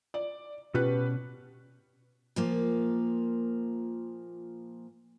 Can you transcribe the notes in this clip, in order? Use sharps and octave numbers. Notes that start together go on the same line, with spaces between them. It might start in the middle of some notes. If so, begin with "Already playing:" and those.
D5
B2 C#4 G4 B4 F#6
A#2 F3 A#3